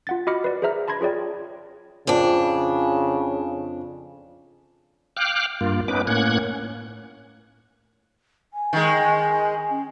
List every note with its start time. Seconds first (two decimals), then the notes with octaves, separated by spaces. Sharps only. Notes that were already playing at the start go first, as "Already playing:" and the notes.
0.07 F4 F#5 A6
0.27 F#4 D#5 B5 D6 F6 C#7
0.44 B4 D5
0.62 G#4 B4 C5 E5 A#5 F6
0.88 A5 B5 C6 G#6 A#6
1.01 F4 G#4 C#5 D5 G5
2.07 F2 C#3 D4
5.17 F5 G5 D6 F6 F#6
5.61 G2 A#3 F4
5.88 B3 C#4 D#4 B4 D6
6.07 A2 A#3 C#4 F#5 F#6 G#6
8.54 G#5
8.73 D#3 G#3
8.98 G#5
9.70 C#4